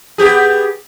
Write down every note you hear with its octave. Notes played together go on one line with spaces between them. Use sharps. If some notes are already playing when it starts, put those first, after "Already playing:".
B3 G4 G#4